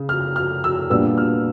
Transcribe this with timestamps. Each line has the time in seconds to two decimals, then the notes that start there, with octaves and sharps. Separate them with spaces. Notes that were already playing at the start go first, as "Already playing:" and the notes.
Already playing: C#3
0.09 F6
0.36 F6
0.64 E6
0.90 A#2 G3 B3 D4 E6
1.17 F6